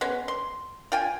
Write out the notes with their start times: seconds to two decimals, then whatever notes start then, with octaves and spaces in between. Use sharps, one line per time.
0.01 G#3 B3 C#4
0.28 C6
0.92 F4 G5 G#5